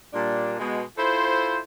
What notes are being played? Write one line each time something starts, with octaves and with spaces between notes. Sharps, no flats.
A#2 G3 D4
B2 G#3
E4 F4 A4 C5